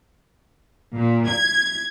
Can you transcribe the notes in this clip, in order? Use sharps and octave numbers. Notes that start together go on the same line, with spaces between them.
A#2
G#6